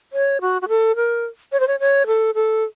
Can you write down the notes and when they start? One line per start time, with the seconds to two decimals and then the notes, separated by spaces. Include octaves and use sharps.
0.13 C#5
0.41 F#4
0.62 F#4
0.68 A4
0.96 A#4
1.52 C#5
1.60 C5
1.67 C#5
1.80 C#5
2.07 A4
2.35 A4